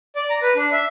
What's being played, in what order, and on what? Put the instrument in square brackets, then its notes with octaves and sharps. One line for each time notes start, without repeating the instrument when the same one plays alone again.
[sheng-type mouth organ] D5
A#5
B4
D4
E5